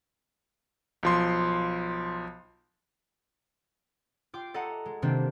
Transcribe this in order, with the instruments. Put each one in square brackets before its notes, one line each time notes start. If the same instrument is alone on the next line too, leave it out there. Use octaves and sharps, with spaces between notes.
[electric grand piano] B1 F3 C6
[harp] F4 G5 C6 D6
A4 D#5 F#5 A#5
G#3
C3 D#3 G3 A#3 C4 D4